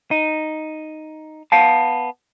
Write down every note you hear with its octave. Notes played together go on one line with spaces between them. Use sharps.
D#4
B3 F5 A5